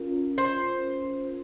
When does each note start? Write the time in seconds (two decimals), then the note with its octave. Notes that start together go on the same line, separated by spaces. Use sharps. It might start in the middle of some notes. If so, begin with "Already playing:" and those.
Already playing: C#4 F4 A#4
0.38 C5